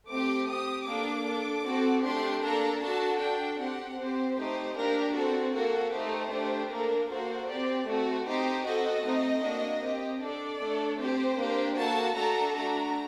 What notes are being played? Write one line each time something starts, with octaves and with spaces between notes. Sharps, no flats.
A3 C4 G4 D6
C4 G4 D#6
A#3 D4 A4 D6
D4 A4
C4 F#4 A4
A3 D4 G4 C6
A#3 D4 A4 A#5
D4 F#4 A4 A5
D4 A4 G5
C4 G4 F#5
C4 G4 C5
A3 D#4 G4 C5
A#3 D4 G4 A#4
C4 F#4 A4
A#3 F#4 A4
A3 D#4 G4 C5
A3 D4 G4
A#3 D4 A4 A#4
A#3 F#4 A4 C5
C4 G4 D5
A3 C4 F#4 A4
C4 D#4 G4 C5
C4 F#4 A4 D#5
A3 C4 D#4
A#3 D4 F#4
C4 G4
D4 A4 D5
A3 D4 A4
C4 G4 C5
A#3 D4 G4
A#3 F#4 A4 A5
A3 D4 F#4 A4 A#5
A3 D4 F#4 A#5